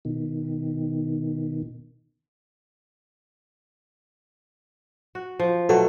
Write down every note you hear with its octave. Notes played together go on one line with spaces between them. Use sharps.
B2 D#3
F#4
F3
B2 F#3 A3 A4